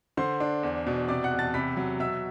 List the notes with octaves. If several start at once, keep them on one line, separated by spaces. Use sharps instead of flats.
D3 C5 C6
D4
E2
B2
C3 D5 D6
F#5 F#6
E2
A5 A6
C3 B5 B6
F#3
B2 E5 E6